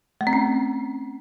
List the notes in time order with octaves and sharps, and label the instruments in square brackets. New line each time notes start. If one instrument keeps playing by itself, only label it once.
[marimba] A3
C4
C#4